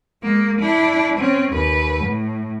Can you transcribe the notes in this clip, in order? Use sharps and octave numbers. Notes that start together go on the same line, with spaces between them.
G#3 A#3
D4 E4
C4 C#4
D#2 B4
A2